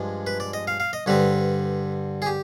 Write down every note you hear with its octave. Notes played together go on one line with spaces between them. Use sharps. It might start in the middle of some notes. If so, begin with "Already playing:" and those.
Already playing: G2 F3 G#3 D4
B4
D5
D#5
F5
F5
D#5
G2 D3 G3 C4 B4
G#4
G4